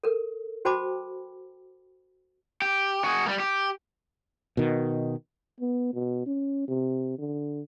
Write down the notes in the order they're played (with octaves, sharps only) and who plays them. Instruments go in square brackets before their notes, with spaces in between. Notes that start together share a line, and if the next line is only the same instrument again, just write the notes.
[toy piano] A4 A#4
F#4 C5 G5 A5 B5 D6
[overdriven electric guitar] G4
F#4 G#4
G3 A#3
G4
[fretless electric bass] B2 D#3
[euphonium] B3
B2
C#4
C3
D3